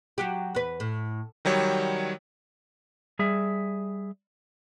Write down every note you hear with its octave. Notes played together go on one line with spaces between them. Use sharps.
F#3 F#4 G4
E2 B4
A2
D#3 F#3 G3 C#5
G3 G#4 E5